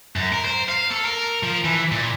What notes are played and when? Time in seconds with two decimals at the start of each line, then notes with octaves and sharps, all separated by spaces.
0.16 F#2
0.33 A#4
0.44 C5
0.69 F5
0.90 A4
1.05 A#4
1.43 F3
1.64 E3
1.92 A#2